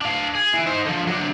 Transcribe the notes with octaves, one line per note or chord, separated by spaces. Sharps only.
D4 F5
G#4
E3
D#4 C5
D3 F3
F#3 D4